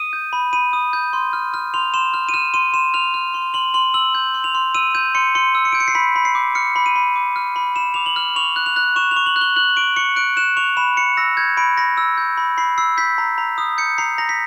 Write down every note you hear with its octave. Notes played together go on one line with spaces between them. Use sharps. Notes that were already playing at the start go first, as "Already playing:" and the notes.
Already playing: D#6 D#7
G6
B5
B5 D#7
D#6
G6
C6
F6
F6
C6 F7
C6 E7
F6
D#7
F6 E7
C6 D#7
C6 E7
F6 F7
F6
C6
C6 F#7
C6 F#7
E6 F#7
G6
C6
F7
C6
E6 D#7
G6 D#7
C6 C#7
C6 C#7
E6
C#7
G6 D7
C#7
C7
B5 B6
B5
C7
D6
F6 C#7
B5
D#7
B5
D6
F6
B5
B5 E7
D6 F7
F#7
F6
C#6 F7
F#6
F7
F#6
C#6 E7
F7
C#6
F#7
F#6
G7
F#6 F#7
C#6 D7
C#6 C#7
F#6 D7
F#6 E7
C#6 F7
B5 E7
B5 C#7
E6 A#6
G6 G#6
B5 D7
B5 A#6
E6
G6
B5
B5 C7
E6 C7
G6 B6
A#5
A#5
D#6
G6 C#7
A#5 C7
A#5 A#6
B6